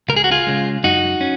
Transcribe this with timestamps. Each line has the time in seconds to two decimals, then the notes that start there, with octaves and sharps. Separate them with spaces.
0.09 C#2 A#4
0.16 G#4
0.24 F#4
0.31 F4 G#4
0.47 C#3 G#3
0.84 F#2 D#4 F#4
1.21 C#4